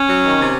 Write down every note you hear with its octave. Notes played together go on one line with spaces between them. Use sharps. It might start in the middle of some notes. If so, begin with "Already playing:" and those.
Already playing: C#4
F#3
D#3
C3